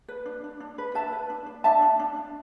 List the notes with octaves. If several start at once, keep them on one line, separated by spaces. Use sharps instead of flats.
B4
D4
D4
D4
B4
B4 E5 A5
B4
D4
D4
D4 E5 A5
D4
D4
D4